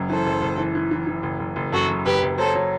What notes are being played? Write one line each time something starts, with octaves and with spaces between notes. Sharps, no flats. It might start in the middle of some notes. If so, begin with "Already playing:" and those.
Already playing: F#1 F#2
E3 A4 C5
F#1
F#1
E3
E3
E3
E3
F#1
F#1
F#1
F#2 F#4 A4
F#2
F#1 G4 B4
F#1
F#3 A4 C5
F#3